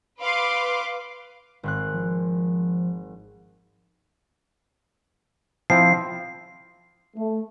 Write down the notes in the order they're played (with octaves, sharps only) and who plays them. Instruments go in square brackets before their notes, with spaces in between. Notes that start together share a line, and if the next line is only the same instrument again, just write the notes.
[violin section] B4 F5 C6 D6
[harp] G#1 C4 F#6
[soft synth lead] F3
[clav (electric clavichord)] F3 C4 E4 [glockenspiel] C7
[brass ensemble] A3